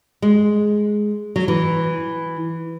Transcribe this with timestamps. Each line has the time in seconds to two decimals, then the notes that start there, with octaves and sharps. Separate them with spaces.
0.22 G#3
1.36 F#3
1.48 E3